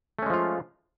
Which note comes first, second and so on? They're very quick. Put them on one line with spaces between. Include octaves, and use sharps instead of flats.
A3 C#4 G#3 F3 F4